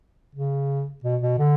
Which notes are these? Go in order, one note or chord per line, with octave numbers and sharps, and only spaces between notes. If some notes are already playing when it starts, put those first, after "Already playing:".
C#3
B2
B2
D3